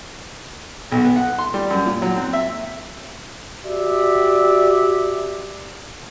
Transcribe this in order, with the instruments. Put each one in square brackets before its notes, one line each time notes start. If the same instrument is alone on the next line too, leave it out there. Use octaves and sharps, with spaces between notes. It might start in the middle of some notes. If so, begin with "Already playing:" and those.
[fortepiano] B1
B3
F#5
C6
G3
F#2
A#2
F#3
C4
E5
[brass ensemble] F#4 G4 D5 E5